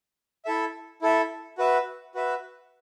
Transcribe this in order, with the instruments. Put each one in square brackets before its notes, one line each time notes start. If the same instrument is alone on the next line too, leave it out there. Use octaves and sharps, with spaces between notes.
[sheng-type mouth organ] E4 A4 E5
E4 A4 E5
F#4 B4 E5
F#4 B4 E5